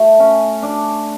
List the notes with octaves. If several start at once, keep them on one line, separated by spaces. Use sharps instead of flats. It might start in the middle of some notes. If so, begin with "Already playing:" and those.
Already playing: A3
C#4
D4